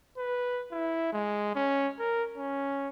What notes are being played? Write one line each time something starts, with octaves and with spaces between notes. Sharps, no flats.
B4
E4
G#3
C#4
A#4
C#4